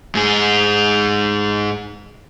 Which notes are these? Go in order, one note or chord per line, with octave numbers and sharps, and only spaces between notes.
G#2 G#4